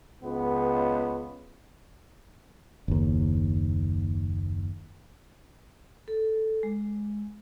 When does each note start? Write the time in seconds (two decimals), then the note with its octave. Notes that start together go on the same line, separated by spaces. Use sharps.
0.23 C#2 B3
2.88 F#1 D#2
6.08 A4
6.63 G#3